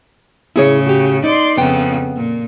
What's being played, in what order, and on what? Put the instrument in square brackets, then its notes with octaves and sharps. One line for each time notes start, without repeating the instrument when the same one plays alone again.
[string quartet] A2 C#3 [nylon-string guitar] E4 G#4 C#5
[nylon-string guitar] F#4 G4
[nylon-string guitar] D#4 [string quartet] D5 C6
[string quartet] F2 C#3 [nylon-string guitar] B3 G5
[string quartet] A#2